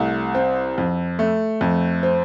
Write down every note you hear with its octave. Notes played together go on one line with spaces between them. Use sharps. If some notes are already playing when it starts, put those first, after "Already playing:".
Already playing: C2 A3
C4
F2
A3
F2
C4